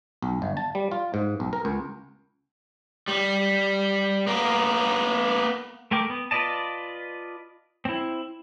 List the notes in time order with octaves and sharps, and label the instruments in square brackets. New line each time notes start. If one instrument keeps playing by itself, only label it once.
[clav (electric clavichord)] B1
G1
A5
G3
F4
G#2
B1
A#4
C#2
[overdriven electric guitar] G3
A#3 B3
[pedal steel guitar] A3 A#4 G5 D6
B3
F4 B4 D5 D#5 A5
C4 E4